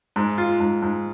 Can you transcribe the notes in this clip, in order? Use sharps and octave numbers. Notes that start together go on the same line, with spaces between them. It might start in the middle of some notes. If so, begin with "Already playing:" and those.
G#2
F4
G#2
G#2